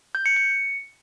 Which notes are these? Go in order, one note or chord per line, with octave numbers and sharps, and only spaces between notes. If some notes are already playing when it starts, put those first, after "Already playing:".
G6
C#7
C#7